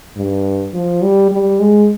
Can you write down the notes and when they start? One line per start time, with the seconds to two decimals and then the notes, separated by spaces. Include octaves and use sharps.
0.16 G2
0.74 F3
1.02 G3
1.31 G3
1.60 G#3